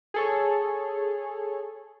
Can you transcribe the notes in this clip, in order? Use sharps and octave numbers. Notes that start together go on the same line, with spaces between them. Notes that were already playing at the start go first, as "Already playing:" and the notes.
G#4 A4 C#5